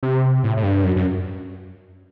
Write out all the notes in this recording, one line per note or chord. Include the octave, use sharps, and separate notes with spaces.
C3
A2
A2
G2
F#2
F#2